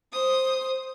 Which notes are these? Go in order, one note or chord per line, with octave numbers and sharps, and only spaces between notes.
C5 D#6